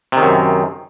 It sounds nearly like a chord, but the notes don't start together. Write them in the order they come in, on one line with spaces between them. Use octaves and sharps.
C3 D#3 F#2